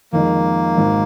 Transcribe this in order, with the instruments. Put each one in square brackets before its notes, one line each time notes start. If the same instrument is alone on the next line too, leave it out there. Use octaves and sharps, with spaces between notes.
[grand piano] F2 D#3 G#3 [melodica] A#3
[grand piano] G#1 G#2 D#3